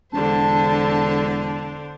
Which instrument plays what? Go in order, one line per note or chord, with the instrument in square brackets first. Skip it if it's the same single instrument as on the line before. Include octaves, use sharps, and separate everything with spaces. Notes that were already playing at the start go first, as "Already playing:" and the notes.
[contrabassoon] E1 [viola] D3 C5 [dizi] A5